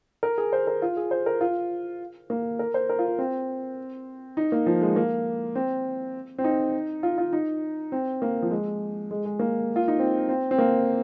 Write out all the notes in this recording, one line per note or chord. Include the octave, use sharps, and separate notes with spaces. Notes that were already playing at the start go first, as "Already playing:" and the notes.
A#4
G#4
C5
A#4
F4
G#4
C5
A#4
F4
A#3
A#4
C5
A#4
F4
C4
D#4
A#3
F3
G#3
A#3
C4
C4
D#4
F4
F4
D#4
C4
A#3
F3
G#3
G#3
G#3
A#3
F4
D#4
C4
C4
C4
A#3